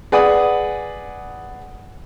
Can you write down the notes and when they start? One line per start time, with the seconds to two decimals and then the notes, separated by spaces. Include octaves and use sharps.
0.12 G#4 B4 D5 F#5 D#6